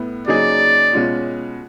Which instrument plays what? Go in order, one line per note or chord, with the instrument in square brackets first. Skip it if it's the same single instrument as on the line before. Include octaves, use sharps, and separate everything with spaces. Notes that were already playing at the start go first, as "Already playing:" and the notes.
Already playing: [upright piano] A2 B3 E4
[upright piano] C#3 F#3 A#3 D#4 G#4 [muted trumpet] D5
[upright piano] B2 G#3 C#4 F4